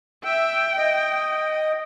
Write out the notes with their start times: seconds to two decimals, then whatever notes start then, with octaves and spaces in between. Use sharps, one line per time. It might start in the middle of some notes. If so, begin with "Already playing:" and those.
0.24 E5 G5
0.78 D#5